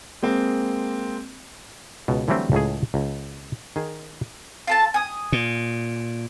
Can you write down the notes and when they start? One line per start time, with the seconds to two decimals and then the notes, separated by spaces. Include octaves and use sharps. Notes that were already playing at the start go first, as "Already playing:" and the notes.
0.22 G#3 A#3 C4
2.08 C#2 B2
2.28 D3 E3 F#3 G3 A3 C4
2.52 C#2 A2 G#4
2.94 C#2
3.76 D#3 G#4
4.67 F4 A4 A5
4.94 G#5 D#6
5.32 A#2